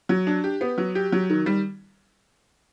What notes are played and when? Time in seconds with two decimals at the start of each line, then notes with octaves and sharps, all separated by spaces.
0.09 F#3
0.27 D4
0.44 G4
0.61 B3
0.78 F#3
0.95 G4
1.12 F#3
1.30 D#3
1.46 G3